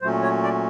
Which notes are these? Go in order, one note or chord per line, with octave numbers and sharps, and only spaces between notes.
A#2 F#3 A3 C#4 C5
C#5
D5